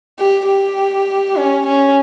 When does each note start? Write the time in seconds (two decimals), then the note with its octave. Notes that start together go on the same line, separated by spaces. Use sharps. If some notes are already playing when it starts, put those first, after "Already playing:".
0.19 G4
0.48 G4
1.37 C#4
1.67 C#4